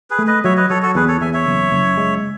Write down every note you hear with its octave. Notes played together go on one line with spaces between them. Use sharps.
G#4 B4
A3
B4 D#5
F#3 C#5 E5
B4 D#5
F#3 A4 C#5
F#4 A4
E2 G#4 B4
A4 C#5
E2 E5 G#5
C#5 E5
F#1
F#1
G#3